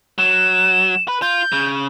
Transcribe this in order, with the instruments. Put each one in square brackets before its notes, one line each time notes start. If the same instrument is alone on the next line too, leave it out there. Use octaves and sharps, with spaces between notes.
[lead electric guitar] F#3 [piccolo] E7
[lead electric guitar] B4
[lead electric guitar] F4 [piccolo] G6
[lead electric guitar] C#3